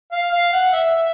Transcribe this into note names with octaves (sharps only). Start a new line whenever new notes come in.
F5
F5
F#5
E5